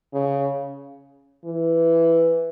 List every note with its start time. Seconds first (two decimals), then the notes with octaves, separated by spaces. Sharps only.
0.13 C#3
1.45 E3